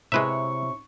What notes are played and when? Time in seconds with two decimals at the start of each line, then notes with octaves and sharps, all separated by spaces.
0.12 C3 G#3 E4 B4 C#5 E5 C#6